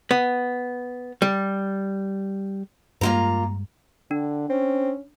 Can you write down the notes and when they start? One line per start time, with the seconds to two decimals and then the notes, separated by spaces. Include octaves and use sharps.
0.11 B3
1.22 G3
3.01 G2 G3 G#3 A#3 F4 A#5
4.11 D3 D4
4.49 C4 C#4